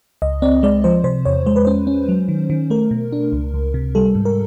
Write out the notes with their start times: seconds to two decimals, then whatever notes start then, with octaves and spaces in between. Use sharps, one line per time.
0.22 C#2 D#5
0.42 C4 D5
0.63 G#3 D5
0.84 F3 C5
1.04 C3 C5
1.25 E2 C#5
1.46 G#3 C5
1.56 B4
1.65 C#4 C5
1.87 C#4
2.09 F#3
2.28 D#3
2.50 D#3
2.70 A3 A#4
2.91 B2
3.13 D4
3.32 C#2
3.54 C#2
3.74 C3
3.95 G3 A4
4.15 G#2
4.25 A#4